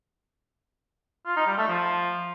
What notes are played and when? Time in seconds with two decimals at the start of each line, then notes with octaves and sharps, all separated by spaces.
1.26 F4
1.37 D#4
1.47 G3
1.58 A3
1.68 F3